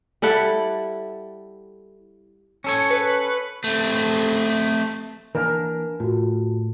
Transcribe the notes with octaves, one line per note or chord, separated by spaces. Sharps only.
G3 E4 A4 F#5
C#4 A4 C#5
B4
A3 C4
E3 A#3 D4 A#4 G#5
A2 F4 F#4